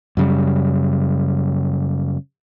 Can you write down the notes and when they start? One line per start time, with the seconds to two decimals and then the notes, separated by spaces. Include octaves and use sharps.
0.17 F#2 C#3 G3